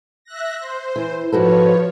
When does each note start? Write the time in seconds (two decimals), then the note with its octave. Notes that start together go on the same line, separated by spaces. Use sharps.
0.24 E5 F#6 A#6
0.59 C5
0.96 E3
1.32 G#2 F3 F#4 A4 B4 C#5